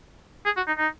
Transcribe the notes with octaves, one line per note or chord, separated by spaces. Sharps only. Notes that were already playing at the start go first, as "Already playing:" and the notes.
G#4
F#4
D#4
D#4